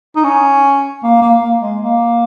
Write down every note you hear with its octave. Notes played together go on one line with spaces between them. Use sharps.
D#4
C#4
A#3
A#3
A#3
G#3
A#3